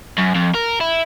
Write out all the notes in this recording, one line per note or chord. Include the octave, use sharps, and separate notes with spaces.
F#2
F2
A#4
E4